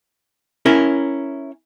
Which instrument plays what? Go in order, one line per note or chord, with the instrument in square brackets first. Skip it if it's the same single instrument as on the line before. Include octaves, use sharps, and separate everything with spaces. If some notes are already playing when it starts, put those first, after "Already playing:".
[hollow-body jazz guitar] C#4 E4 A#4